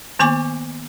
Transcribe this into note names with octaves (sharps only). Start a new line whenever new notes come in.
D#3 A#3 B3 G#5 C#6 D6